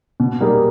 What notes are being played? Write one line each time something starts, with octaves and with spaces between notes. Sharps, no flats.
B2
G3 A#3 D#4 G#4